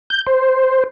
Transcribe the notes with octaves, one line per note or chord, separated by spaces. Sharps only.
G6
C5